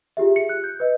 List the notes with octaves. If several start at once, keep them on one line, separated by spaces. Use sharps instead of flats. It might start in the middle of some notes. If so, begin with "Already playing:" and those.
F4 G4 G#4 E5
C#7
F#6
G6
B4 D#5